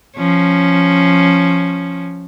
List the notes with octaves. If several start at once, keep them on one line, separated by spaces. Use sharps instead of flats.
F3 C#4